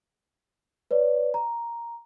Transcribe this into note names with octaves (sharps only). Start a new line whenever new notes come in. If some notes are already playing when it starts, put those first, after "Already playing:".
B4 C#5 D5
A#5